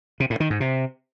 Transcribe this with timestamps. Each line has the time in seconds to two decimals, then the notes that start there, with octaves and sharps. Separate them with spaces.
0.20 C3
0.30 A2
0.40 D#3
0.50 G#2
0.60 C3